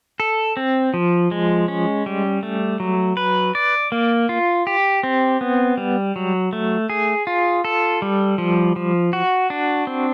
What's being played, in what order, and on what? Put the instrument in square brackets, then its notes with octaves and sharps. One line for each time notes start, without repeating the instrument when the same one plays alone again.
[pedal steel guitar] A4
C4
F3
G#3
C#4
G3
A3
F#3
B4
D5
A#3
F4
G4
C4
B3
G3
F#3
A3
G#4
F4
A4
G3
F3
F3
F#4
D4
C4